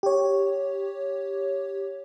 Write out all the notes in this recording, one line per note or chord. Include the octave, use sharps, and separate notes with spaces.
G4 C#5